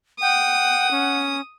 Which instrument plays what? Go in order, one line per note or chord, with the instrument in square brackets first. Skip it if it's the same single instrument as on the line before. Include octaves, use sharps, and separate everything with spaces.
[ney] F#5 [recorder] G5 [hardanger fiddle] D#6
[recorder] C#4